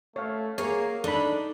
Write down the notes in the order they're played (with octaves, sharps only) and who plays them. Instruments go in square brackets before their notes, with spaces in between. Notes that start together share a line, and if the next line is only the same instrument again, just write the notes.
[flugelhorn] A3 [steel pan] C#5 F5
[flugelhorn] A#3 [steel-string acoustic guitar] G#4 A#4 F5 [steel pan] C#5
[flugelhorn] D4 [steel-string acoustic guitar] D#4 [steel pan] A4 B5